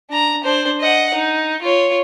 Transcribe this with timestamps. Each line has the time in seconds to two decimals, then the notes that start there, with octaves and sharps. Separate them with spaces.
0.10 D4 A#5
0.44 D4 C5
0.80 D#5 F#5
1.14 D#4
1.62 F4 C#5